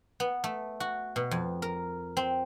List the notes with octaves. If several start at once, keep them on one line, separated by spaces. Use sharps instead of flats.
B3
A3
F#4
B2
F2
A#4
C4